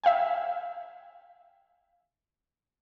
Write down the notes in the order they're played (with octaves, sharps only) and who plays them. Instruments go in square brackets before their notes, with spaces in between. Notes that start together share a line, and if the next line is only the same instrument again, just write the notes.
[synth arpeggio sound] E5 F5 G5 G#5